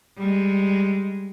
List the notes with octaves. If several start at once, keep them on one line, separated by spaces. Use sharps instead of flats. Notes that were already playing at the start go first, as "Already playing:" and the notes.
G3 G#3